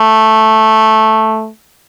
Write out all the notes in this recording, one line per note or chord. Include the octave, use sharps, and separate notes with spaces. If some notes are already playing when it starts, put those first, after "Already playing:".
Already playing: A3